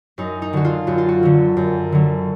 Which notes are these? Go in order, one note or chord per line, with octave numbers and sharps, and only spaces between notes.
F#2 D#4
D#4
D3 F#3 F#4
F4
F#2 F#4
F4
F#4
D3 F#3
F#2
D3 F#3